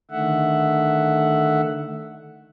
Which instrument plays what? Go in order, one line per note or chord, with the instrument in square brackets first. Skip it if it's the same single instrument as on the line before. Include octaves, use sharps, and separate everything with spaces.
[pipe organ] D3 D#3 A3 E5 F#5